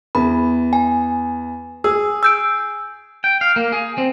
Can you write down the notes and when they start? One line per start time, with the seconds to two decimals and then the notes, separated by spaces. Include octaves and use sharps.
0.15 E2 B5
0.73 G#5
1.84 G#4 E6
2.23 E6 G6 D7
3.24 G5
3.41 F5
3.56 A#3
3.72 G#4
3.98 C4